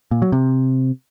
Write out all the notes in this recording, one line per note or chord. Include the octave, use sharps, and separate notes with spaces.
A#2
F#3
C3